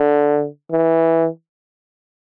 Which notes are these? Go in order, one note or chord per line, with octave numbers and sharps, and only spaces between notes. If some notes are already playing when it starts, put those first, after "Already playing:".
Already playing: D3
E3